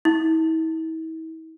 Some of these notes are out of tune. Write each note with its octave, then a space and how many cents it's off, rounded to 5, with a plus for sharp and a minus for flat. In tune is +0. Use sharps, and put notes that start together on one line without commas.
E4 -40